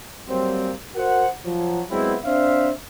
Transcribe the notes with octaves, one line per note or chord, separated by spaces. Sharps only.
F#3 G3 A#3 C4
F#4 A#4 C5 F#5
F3 F#3
F#3 G#3 B3 C4 E4
C4 D4 C5 E5 F5